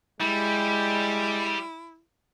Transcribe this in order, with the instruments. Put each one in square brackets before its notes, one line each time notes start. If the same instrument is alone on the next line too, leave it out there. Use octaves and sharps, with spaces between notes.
[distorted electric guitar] G3 [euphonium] G#3 [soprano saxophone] E4